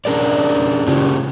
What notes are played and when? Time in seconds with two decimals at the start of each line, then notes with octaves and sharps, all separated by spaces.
0.05 C#4 D4 G#4 A#4 C#5 D5
0.87 C#3 C#4 F4 G4